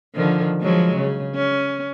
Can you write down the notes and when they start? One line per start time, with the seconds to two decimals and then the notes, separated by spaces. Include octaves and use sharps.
0.15 D3 D#3 F3
0.60 F3 F#3 G#3
0.96 C#3
1.35 C#4